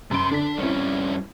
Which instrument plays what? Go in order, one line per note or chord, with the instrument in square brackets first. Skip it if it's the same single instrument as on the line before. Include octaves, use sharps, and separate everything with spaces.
[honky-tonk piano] F#2 B5 D7 [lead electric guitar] C3 C6
[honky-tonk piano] D3 B6 [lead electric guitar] D4
[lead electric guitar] G2 C#4 [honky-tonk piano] C4 E4